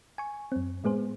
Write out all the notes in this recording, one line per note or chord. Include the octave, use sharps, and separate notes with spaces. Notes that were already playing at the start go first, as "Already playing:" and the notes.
G#5 C#6
F#2 C4
A2 G#3 B3 G#4 C5